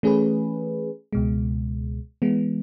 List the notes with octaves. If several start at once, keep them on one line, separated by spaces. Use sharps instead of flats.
E3 A3 C#4 G#4 B4
C#2 B2 G#3
E3 G#3 B3